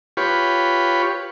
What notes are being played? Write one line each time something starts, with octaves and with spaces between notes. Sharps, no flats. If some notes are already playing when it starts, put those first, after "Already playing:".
F4 G4 B4 C#5